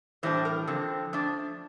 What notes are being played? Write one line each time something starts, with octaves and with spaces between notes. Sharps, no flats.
A2 E3 G3 D4 C5
A#4
D3 F3 C4
F3 A3 D4